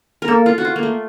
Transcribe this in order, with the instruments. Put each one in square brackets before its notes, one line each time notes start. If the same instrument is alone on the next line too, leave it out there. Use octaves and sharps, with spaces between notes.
[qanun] A#4
[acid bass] A#3 [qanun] A4
[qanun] F4
F#4
F4
A#3
A3